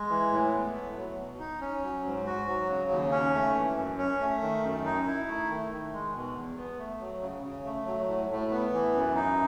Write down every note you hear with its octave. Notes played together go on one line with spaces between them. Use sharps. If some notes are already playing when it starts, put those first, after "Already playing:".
Already playing: G#3
E3
A2
B3
A3
F#3
B2
D#4
C#4
F#3
G#2
F#4
F#3
C#3
D#2
C#4
A3
E3
F#2
C#4
A3
D#3
F#2
D#4
E4
A3
D#3
D#3
G#3
B2
E2
B3
A3
F#3
C#3
C#3
A3
F#3
A2
A2
B3
E3
F#2
D#4